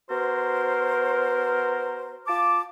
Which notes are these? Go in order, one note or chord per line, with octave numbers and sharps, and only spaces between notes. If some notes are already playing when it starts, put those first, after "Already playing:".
B3 F#4 A#4 C5
F4 A5 D6